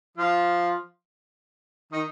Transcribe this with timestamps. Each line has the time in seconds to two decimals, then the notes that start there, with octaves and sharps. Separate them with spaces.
0.17 F3 F4
1.92 D#3 D#4